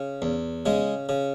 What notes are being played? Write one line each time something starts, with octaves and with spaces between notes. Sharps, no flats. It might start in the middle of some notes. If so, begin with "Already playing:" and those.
Already playing: C#3
E2
C#3 G#3
C#3